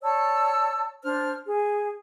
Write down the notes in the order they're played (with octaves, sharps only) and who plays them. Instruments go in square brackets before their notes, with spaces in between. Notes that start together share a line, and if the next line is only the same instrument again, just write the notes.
[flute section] C#5 D5 A5 E6
D4 C5 F6
G#4